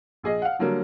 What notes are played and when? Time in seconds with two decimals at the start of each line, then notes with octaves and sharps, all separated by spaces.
0.23 A#1 G#4 D#5
0.42 F5 F#5
0.59 D3 F#3 G3 A#3